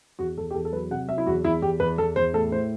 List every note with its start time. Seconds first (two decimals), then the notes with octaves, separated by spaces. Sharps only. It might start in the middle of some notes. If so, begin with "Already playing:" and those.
0.19 E2 F#4
0.38 E2 A4
0.50 G4
0.54 E2 A4
0.65 A4
0.72 F#3 B4
0.91 C3 F#5
1.08 F#3 E5
1.18 E4
1.27 E2 F#4
1.44 E2 E4
1.62 E2 G4
1.80 E2 B4
1.98 E2 A4
2.16 E2 C5
2.34 A2 A4
2.52 A2 C5